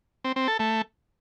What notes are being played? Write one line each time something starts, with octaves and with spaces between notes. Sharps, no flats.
C4
C4
A4
A3